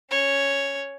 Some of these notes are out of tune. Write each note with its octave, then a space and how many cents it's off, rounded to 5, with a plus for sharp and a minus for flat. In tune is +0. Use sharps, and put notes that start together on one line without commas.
C#4 +0 C#5 +0